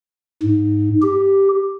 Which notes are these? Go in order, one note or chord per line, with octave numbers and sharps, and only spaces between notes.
G#2
G4